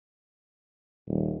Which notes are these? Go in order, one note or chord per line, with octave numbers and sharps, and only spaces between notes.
D#1